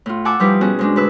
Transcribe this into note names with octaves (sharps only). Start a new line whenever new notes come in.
A2 F4
F#5 G#5 A5 D6 E6
F3 G3 D#4 E4 G4 B4
B2 C#4 F#4 G#4
G#2 G#3 D4
D2 B4 E6